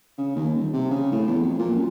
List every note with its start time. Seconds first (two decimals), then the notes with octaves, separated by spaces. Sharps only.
0.18 C#3
0.35 D#2
0.55 D#1
0.73 C3
0.90 C#3
1.12 A2
1.27 E2
1.43 F2
1.59 A#2
1.75 F#2